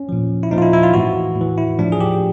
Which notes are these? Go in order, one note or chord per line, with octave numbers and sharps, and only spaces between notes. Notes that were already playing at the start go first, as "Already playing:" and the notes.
Already playing: C#4
A#2 F3
E4
A#2 F3 D#4
F4
E4
E4
F4
A2 E3 F#4
A2 E3
E4
A2 F3 D4
G#4
G4